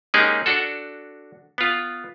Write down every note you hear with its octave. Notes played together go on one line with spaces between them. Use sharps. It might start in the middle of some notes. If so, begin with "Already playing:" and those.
G#3 A#3 C#4 D#4 G4 G#4
D4 F#4 A4
B3 F4